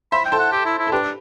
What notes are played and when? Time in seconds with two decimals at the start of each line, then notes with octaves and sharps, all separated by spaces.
0.12 C5 E5 B5
0.25 G5
0.32 A4 C5
0.39 F#5
0.52 G4
0.65 E4
0.78 E4
0.87 A4
0.92 D4 G4 B4